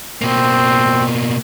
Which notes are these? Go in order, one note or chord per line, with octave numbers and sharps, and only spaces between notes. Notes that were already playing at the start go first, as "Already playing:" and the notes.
B2 A#3 C4